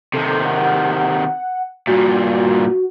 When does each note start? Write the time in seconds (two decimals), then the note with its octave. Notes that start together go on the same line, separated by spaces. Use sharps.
0.14 C3 D#3 A4
0.45 F#5
1.87 G2 A#2 F#4